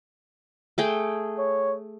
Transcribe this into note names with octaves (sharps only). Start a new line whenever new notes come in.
A3 G#4 G5
C#5